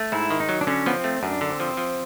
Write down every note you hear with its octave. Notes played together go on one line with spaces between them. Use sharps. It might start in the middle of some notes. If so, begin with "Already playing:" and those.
Already playing: A3
G#2 E4
D#3
D#4
F#3
D4
D3 C#4
F3 B3
C4
A3
F#2 D4
D3
C4
F3
F3